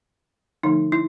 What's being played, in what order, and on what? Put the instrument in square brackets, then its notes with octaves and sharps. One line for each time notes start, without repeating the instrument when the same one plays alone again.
[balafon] D3 F3 A3 D#4
E4